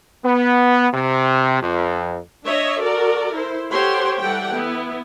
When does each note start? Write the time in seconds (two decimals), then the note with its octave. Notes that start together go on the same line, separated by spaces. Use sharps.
0.24 B3
0.93 C3
1.61 F2
2.45 D4 C#5 D#5 E5
2.80 F#4 A4 A#4 D5
3.35 E4 C5
3.71 G4 A4 C5 C#5 F#5 C6
4.19 E3 G3 G4 A4 F#5 G5
4.53 B3 E4